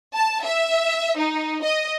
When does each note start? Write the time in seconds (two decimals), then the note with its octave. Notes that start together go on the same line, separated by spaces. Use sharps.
0.13 A5
0.44 E5
1.18 D#4
1.63 D#5